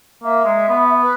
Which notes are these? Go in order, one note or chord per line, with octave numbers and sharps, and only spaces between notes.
A#3 E5
G#3
B3
B4